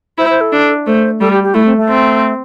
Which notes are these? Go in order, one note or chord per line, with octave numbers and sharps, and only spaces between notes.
E4 C5
C5
A4
D4
A3 C5
G3 A4
G4
G4
A3 E4
C4
A3
C4